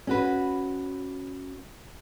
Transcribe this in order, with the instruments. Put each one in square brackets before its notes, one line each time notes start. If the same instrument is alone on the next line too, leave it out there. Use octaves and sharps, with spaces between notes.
[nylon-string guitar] C#4 F#4 B4